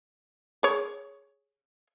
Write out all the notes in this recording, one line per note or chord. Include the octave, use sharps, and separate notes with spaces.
G#4 C#5